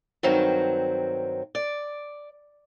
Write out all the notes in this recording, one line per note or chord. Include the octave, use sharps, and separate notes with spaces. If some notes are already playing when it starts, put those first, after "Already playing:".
G2 D#3 F#3 C4 F#4
D5